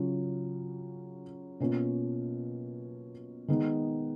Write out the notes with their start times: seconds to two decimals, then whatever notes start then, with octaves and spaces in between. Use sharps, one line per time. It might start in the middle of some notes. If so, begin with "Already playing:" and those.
Already playing: C#3 F#3 C#4 F4
1.60 B2 A#3 C#4 F4
3.48 D#3 G#3 B3 D#4